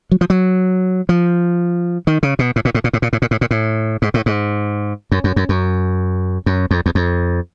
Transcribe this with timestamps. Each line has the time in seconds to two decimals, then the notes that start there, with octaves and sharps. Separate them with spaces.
0.12 F#3
0.21 F3
0.30 F#3
1.09 F3
2.07 D#3
2.23 C#3
2.39 B2
2.56 A2
2.65 A#2
2.75 A2
2.84 A#2
2.93 A2
3.02 A#2
3.13 A2
3.22 A#2
3.31 A2
3.41 A#2
3.51 A2
4.02 G#2
4.14 A2
4.26 G#2
5.12 F#2
5.24 F#2
5.36 F#2
5.49 F#2
6.46 F#2
6.71 F2
6.86 E2
6.95 F2